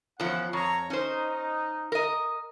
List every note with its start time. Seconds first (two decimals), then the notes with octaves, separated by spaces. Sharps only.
0.20 E2 F3 A#3 C#4 F#5
0.53 F2 C#5 A#5 C#6
0.90 C#4 D#4 C5
1.92 A#4 D#5